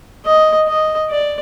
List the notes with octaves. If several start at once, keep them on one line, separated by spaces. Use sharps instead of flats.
D#5
D#5
D5